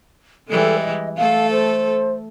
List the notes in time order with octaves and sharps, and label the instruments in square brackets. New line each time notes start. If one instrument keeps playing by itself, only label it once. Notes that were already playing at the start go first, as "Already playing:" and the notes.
[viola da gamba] E3 G3 G#3 [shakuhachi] A4
[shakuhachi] D#5
[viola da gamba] A3 A4 [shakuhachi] F5
[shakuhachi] C5